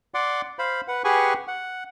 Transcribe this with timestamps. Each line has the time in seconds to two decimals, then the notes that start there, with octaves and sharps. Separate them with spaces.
0.14 D5 F#5 C6 D6
0.59 C5 F5 B5
0.88 B4 F#5
1.04 G4 G#4 B4 F#5 G#5 C#6
1.48 F#5